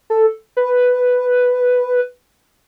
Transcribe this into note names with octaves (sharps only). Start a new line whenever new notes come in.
A4
B4